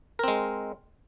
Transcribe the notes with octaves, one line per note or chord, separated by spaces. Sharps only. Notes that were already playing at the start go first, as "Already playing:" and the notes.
G#3 C4 A#4